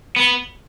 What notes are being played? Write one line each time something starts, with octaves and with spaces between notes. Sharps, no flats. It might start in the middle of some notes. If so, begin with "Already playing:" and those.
B3